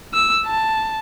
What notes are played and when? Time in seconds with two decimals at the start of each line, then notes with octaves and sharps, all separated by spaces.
0.14 E6
0.46 A5